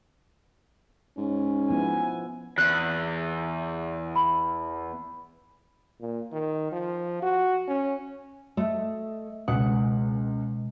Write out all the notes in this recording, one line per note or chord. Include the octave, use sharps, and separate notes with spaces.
G#2 C#4
F3 B3 E4 G#5
E2 F#6
B5
A#2
D#3
F3
F#4
C#4
A3 D#5 E5
C#2 B2 G#3 F#5